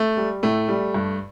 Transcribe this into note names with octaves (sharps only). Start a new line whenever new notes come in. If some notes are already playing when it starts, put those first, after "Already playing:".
Already playing: A3
G3
A2 A3
G3
G2